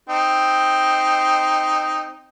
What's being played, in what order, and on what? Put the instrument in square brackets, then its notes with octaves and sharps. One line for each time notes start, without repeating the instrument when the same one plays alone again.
[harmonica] C4 D#4